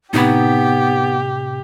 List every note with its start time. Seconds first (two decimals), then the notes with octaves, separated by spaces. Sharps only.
0.14 A2 C3 B3 D#4 G4 B4 B5 G#6